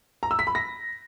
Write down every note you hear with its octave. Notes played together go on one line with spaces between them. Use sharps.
A#5
E6
B6
B5
A#6